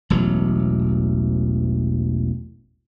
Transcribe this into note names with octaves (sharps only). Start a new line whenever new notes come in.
E1 A1 F#3